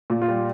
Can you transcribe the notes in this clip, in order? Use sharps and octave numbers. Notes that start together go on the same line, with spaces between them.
A#2
F4
G3